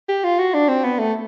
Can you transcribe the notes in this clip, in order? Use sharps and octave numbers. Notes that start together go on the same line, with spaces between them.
G4
F4
F#4
D4
C4
B3
A3